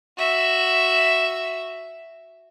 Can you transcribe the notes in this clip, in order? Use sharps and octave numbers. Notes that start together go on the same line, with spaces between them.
F#4 E5